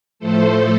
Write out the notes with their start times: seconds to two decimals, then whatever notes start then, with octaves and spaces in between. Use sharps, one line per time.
0.19 A2 F3 A3 A4 C5